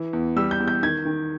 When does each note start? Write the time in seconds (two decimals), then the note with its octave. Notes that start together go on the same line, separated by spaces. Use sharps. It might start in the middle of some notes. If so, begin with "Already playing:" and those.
Already playing: E3
0.13 E2
0.36 G3 E6
0.51 G6
0.60 E2
0.68 G6
0.83 D#3 G#6
1.05 D#3